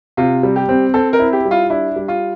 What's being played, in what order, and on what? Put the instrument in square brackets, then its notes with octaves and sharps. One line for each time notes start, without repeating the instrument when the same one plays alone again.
[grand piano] C3 [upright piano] F4
[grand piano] G3
[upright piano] G4
[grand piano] C4
[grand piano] C4 [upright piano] A4
[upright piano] A#4
[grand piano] E4
[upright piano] G4
[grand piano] G3
[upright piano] F4
[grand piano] D4 [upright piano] E4
[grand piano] G3
[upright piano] F4